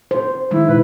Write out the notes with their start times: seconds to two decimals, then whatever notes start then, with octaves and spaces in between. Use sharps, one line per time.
0.11 C5
0.51 D#3 G#3 D#4 E4
0.69 B2 B4